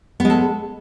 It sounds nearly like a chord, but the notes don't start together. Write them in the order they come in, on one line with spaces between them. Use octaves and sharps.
B3 G#3 A4